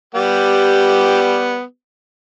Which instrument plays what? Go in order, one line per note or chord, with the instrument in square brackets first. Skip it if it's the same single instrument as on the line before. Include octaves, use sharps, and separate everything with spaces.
[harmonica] G3 B3 G4